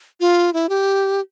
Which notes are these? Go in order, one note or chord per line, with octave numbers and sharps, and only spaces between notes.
F4
E4
G4